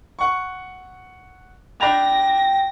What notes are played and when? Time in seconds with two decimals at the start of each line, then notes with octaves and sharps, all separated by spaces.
0.19 F#5 C#6
1.81 D4 G5 B5 A#6 F7